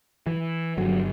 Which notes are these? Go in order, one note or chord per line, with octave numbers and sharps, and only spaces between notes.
E3
G1 G2 F#3